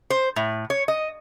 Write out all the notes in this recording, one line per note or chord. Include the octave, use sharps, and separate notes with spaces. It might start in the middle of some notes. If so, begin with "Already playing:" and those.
C5
A2
C#5
D#5